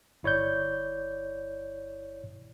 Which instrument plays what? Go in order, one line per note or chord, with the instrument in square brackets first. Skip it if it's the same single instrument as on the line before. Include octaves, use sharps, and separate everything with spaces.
[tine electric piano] G1 E4 C#5 D5 G6